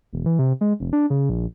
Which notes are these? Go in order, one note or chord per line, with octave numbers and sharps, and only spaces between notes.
E1
E3
C3
G#3
F1
D4
C#3
A#1